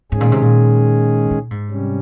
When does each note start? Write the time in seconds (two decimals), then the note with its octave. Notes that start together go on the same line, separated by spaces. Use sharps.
0.11 G#2 D#3 G#3 C#4 G#4
0.21 A#2
0.32 C3
0.42 A#2
1.31 A#2
1.51 G#2
1.70 C3 G3 C#4